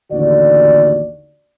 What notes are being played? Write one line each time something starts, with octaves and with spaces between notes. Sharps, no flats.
A1 D#2 D3 F#4 D5